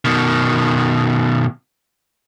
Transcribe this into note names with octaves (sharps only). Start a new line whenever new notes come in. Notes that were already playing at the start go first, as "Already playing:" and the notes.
B2 D#3